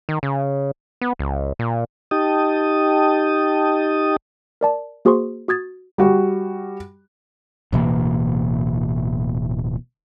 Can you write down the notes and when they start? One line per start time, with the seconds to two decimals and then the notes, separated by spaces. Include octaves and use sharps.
0.09 D#3
0.23 C#3
1.01 B3
1.19 C#2
1.59 A#2
2.11 D#4 G4 D#5 G5 A5 D#6
4.61 A#4 D5 A5
5.05 A#3 F#4 G#4 C5 C6 C#6
5.48 F#4 D#6 G#6 A6
5.98 G3 F#4
7.73 D1 B2 E3 A#3